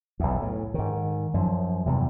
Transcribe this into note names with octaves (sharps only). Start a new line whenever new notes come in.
B1 E2
A2
G#2 D#3
F#2 F3
E2 G2 C3